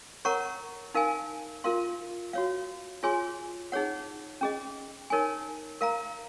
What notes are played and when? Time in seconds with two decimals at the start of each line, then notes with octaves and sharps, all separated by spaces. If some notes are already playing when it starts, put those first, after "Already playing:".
0.25 A#4 C#5 F#5 A#5 C#6
0.94 D#4 A#4 F5 G#5
1.64 F4 A#4 F5 C6
2.33 F#4 C#5 F5
3.03 F4 G#4 C#5 G#5 C6
3.72 D#4 G#4 C#5 F#5
4.41 C#4 G#4 D#5
5.10 D#4 A#4 C#5 G#5
5.81 A#4 F5 A#5